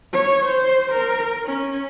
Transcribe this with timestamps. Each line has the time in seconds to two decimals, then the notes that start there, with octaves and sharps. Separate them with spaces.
0.13 C#5
0.45 C5
0.92 A#4
1.45 C#4